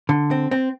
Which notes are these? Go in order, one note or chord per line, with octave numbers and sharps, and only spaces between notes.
D3
C4
C4